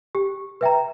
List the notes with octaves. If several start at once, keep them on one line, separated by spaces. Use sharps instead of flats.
G4
B4 E5 G5 A#5